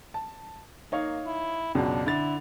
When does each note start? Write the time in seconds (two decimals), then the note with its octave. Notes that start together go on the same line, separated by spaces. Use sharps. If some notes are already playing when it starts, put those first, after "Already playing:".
0.14 A5
0.92 A#3 D#4 C#5 F5
1.26 E4
1.75 C#2 F#2 B2 D4
2.06 D3 E4 A6